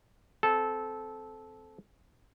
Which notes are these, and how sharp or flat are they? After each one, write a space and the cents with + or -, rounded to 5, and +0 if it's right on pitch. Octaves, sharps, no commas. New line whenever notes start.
C4 -10 A4 -15